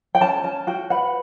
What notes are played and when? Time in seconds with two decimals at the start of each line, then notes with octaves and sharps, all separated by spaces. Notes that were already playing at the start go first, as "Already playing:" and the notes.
0.15 G5
0.21 C#4 A5
0.44 C#4 A5
0.67 F#4 G5
0.90 B4 F#5